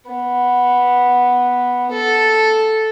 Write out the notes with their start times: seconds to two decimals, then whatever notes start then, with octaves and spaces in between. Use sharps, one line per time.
0.11 B3
1.92 A4